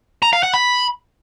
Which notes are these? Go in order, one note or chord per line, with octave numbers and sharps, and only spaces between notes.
A#5
F5
F#5
B5